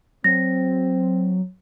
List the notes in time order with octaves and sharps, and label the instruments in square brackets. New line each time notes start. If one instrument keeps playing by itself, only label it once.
[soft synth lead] F#3 [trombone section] C4 [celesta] A#6